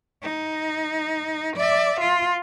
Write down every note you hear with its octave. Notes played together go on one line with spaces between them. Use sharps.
D#4
D5 E5
F4